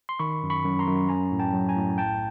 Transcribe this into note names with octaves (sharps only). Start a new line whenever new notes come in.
C6
D#3 B5 C#6
F#2
B5 C#6
F#2
A#5 C6
F#2
F#3 G#5 A#5
A2
G5 A5
F#3
G#5 A#5
A2
B1 G5 A5